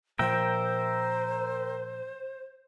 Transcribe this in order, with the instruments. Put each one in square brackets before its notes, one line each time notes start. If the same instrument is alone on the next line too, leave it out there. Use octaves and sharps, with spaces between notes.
[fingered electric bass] A#2 F3 [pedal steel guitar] A#4 E5 G5 [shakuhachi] C5